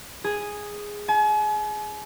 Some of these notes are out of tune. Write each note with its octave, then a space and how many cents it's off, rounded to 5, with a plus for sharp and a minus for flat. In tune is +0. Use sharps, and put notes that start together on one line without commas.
G#4 -5
G#5 +40